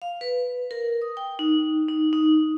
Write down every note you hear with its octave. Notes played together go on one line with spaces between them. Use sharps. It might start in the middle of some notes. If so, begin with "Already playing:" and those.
F5
B4
A#4
D#6
G5
D#4
D#4
D#4